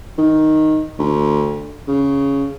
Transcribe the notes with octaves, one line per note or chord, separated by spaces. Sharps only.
D#3
D2
C#3